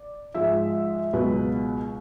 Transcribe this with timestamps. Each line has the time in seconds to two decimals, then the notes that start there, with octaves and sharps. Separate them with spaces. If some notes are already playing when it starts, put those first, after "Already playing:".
Already playing: D5
0.34 G#2 F3 G#3 E5
1.13 C#2 B2 F#3 B4